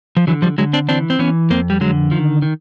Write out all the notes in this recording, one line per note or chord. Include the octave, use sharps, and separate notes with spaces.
F3
D3 E3 F#3
F3 G3
D3 F#3 G#3
C4 D4
E3 C4 D4
C4
E3 B3 C#4
F2 A#3 C4
G3
D3 F#3 G#3
D#3 F3
D#3